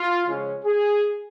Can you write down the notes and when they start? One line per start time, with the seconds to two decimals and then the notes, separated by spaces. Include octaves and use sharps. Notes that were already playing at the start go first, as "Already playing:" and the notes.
Already playing: F4
0.26 C#3 F3 G#3 C#4
0.65 G#4